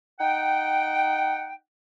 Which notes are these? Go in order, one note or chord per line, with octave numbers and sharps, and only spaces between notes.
D#4 F#5 G5